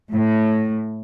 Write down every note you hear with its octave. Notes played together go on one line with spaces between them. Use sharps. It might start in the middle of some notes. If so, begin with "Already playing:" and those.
A2